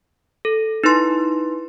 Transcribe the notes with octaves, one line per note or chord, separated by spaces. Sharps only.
A4
D#4 E4 B4 C6